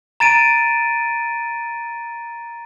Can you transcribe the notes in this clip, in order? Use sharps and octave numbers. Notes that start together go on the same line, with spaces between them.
A#5 A6 D7 D#7